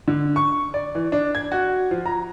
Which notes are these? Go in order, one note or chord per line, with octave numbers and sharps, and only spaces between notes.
D3
C#6
D5
E3
D4
G#6
F#4
F3
A#5